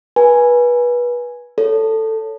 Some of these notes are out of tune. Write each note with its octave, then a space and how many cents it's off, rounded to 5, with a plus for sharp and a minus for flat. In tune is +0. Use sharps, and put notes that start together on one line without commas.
B4 -25 G#5 +0
A4 +10 C#5 +10